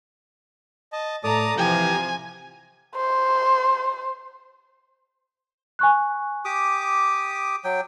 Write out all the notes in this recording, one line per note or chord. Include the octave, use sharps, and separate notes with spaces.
D#5 A5
A2 A4 D5 A5 A#5 D#6
C3 E3 F3 G4 G#5 A#5
C5
G#5 C#6 F#6
G4 D6 D#6
F#3 G5